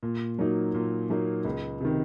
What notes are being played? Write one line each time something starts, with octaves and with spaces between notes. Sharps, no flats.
A#2
F#3 A#3 D#4
A#2
F#3 A#3 D#4
C#2
C3 D#3